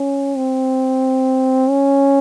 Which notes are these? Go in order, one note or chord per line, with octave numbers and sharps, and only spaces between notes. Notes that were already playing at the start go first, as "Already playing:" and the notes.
Already playing: C#4
C4
C#4